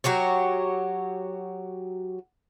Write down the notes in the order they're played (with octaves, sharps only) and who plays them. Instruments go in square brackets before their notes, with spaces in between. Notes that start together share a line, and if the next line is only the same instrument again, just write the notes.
[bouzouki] F#3 F#4 G4 C#5